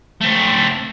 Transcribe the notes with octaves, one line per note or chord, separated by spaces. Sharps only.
A3 C4